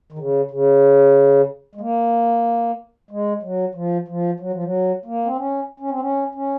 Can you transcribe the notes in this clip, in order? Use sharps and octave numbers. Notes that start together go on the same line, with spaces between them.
D#3
C#3
C#3
G#3
A#3
G#3
F#3
F3
F3
F#3
F3
F#3
A#3
C4
C#4
C#4
C4
C#4
C#4